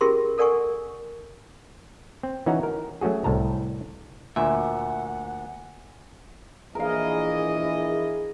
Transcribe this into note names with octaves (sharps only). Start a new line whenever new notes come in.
C#4 F4 G4 G#4 A#4 C6
A4 A#4 D5 F#5 G#5 C#6
C4
E3 C#4 D#4 F#4 F#5 A#5
A#4
F#3 A3 C#4 F#4 G#4
C2 A2 A5 A#5
D2 A#2 E5 F#5 G#5
A#1 E3 G#4 A#4 D#5 F5